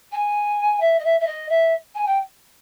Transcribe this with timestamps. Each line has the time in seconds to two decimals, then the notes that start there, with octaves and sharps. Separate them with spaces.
0.12 G#5
0.80 E5
0.98 D#5
1.04 E5
1.19 E5
1.26 D#5
1.48 E5
1.94 G#5
2.05 G5